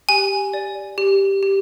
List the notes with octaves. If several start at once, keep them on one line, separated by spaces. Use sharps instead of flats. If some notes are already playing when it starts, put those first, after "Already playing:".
G4 G#5
D5
G4
G4